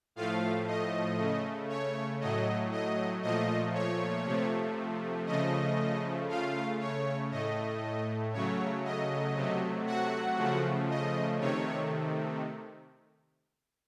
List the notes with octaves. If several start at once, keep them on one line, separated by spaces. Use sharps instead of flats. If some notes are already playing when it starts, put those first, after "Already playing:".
A2 F3 A3 F4 F5
D#5
C#3 A3
C#5
A2 F#3 A3 D#5
D#5
A#2 F3 A3 D#5
C#5
C3 F3 A3
C#3 F3 A3 D#5
C#3 A3 F4 F5
C#5
A2 A3 D#5
C#3 F#3 A3 C#5
D#5
C3 F#3 A3
F#4 F#5
C#3 F3 A3
D#5
C3 D#3 A3 C#5